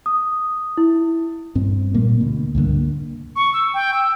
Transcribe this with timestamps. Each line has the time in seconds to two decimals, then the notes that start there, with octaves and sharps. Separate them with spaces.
0.06 D#6
0.77 E4
1.55 G2 C4
1.94 A#2 G3 A#3
2.20 D2 B2
2.55 C#2 G2 D3 A#3
3.36 C#6
3.53 E6
3.74 G5
3.94 E6